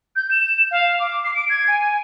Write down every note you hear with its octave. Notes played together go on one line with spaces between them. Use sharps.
G6
E7
F5
D6
C7
D7
G#6
G#5